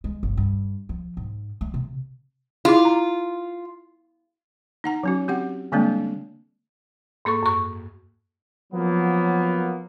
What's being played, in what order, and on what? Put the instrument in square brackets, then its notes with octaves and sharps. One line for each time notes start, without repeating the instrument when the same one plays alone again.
[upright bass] G#3
G1
G2
F3
G#2
A3
C3
[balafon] E4 G#4 D6 [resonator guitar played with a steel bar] F4
[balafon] A#5
D#4 F#5 A#5
F#3 C#4 F#4
C4 G4 F#5
D3 G3 G#3 A#3 C4 D4
[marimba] G#2 A#3 A4 C#6
F#2 C#6
[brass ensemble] F3 F#3 A#3 B3